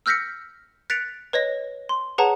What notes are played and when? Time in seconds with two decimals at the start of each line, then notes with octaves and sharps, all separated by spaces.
0.06 E6 F6 G6 A#6 B6 C#7
0.90 F#6 A6 B6 C#7 D7 F7
1.33 B4 C#5 D#5 A#6
1.89 C6
2.18 G#4 B4 C#5 F#5 A5 A#5